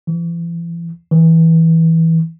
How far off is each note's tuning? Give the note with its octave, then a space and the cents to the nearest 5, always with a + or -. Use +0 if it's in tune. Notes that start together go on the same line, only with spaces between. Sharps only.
E3 +40
E3 -15